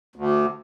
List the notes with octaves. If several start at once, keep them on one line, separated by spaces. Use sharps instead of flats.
D2